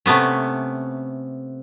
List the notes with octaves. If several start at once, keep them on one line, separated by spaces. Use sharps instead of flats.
C3 A3 B3 C#4